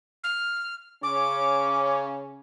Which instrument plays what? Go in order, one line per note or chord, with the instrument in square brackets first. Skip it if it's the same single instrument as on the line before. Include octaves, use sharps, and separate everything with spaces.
[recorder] F6
[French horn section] C#3 C#4 [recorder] D6